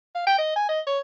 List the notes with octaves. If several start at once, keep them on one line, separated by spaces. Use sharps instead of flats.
F5
G5
D#5
G#5
D#5
C#5